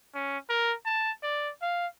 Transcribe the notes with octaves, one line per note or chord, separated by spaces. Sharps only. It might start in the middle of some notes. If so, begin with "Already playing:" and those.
C#4
A#4
A5
D5
F5